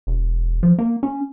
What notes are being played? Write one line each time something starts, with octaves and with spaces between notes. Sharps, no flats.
E1
F3
A#3
C#4